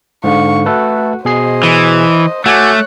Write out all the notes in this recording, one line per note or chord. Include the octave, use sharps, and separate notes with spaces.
G#2 D3 F5 C#6
A3 F#4 A4 B4
B2 G#4 C5 D#5 C7
E3
A3 F#4 C#5 G#5 D6 F#6